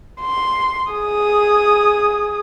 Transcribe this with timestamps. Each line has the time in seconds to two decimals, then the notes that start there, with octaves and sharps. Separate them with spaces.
0.21 C6
0.92 G#4 D#6